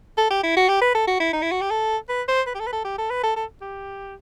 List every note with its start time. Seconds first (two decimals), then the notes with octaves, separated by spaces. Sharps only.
0.18 A4
0.31 G4
0.43 E4
0.57 F#4
0.69 G4
0.81 B4
0.95 A4
1.07 F#4
1.20 E4
1.33 D#4
1.42 E4
1.52 F#4
1.62 G4
1.70 A4
2.09 B4
2.28 C5
2.47 B4
2.55 G4
2.60 A4
2.67 B4
2.72 A4
2.85 G4
2.98 A4
3.10 B4
3.23 A4
3.36 A4
3.62 G4